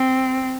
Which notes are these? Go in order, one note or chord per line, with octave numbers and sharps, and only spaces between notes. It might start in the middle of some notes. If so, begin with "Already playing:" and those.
Already playing: C4